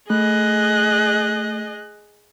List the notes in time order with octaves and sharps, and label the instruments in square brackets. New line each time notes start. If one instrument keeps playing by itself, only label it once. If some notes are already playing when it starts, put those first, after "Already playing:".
[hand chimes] A3 [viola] G#4 D#5 [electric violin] F#6